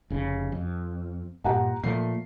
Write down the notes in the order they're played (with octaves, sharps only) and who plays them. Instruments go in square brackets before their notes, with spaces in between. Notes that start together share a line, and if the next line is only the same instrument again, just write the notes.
[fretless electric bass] F1 C#3
F2
[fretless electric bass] G2 A#2 [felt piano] G4 F#5 A#5
[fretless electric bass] A#2 F3 A3 [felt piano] C7